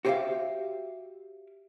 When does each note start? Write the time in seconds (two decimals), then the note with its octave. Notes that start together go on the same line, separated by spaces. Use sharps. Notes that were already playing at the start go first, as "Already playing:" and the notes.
0.05 F#4 G4 C5 D5 E5 F5